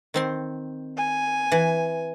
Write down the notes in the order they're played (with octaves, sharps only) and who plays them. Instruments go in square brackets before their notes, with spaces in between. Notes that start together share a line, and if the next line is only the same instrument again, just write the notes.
[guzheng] D#3 C4 C6
[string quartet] G#5
[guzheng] E3